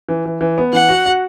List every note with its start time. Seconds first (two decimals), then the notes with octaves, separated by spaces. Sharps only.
0.09 E3
0.26 E3
0.41 E3
0.58 B3
0.73 E3 F#5
0.89 F#4
1.06 F#4